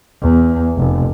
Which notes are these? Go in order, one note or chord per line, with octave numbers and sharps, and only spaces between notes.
E2
F1